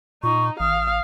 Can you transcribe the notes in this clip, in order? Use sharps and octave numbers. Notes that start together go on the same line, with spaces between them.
A#2 D#4 C#6
A1 F5 D#6